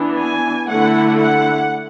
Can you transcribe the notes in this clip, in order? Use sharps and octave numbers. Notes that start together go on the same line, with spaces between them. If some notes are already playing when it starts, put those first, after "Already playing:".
Already playing: E3 B3 D4
G#5
D3 A3 E4 F#5
F#5